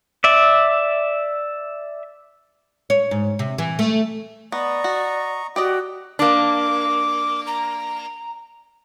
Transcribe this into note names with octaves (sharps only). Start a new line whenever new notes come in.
D5 E5
C#5
G#2
C3
E3
A3
B3 D5 D#5 A#5 C#6
F#4
F#4 G4 D5 D#5
A#3 D4 D6
A#5